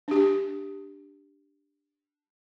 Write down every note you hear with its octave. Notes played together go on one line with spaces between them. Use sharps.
D4 G4